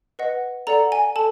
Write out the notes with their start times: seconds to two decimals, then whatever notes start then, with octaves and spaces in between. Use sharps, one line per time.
0.19 B4 D#5 F#5
0.67 A4 D5 F#5 A#5
0.92 G#5
1.16 A4 A5